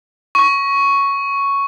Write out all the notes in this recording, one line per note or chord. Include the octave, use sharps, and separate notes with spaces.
C#6